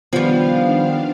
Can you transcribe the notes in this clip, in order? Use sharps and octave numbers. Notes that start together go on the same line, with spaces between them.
D#3 F3 G3 B3 D4 F5